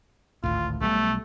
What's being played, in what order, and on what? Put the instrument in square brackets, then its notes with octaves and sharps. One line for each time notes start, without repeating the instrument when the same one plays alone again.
[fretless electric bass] G#1 D2 A2 [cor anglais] F4
[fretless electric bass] B1 B2 G3 [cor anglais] A3